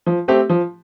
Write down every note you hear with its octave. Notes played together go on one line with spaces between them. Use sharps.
F3
A3 C4 G4
F3